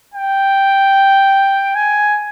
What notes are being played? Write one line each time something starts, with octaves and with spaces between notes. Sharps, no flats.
G5
G#5